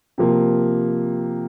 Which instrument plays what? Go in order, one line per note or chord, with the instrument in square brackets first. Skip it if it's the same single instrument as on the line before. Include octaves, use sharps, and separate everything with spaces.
[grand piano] C3 F3 A#3